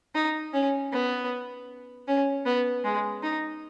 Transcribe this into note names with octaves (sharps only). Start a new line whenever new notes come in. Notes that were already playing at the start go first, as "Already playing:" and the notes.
D#4
C#4
B3
C#4
B3
G#3
D#4